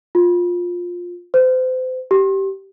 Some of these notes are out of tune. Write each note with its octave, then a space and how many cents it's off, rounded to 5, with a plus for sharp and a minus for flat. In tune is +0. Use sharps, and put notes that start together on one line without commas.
F4 +15
C5 -35
G4 -15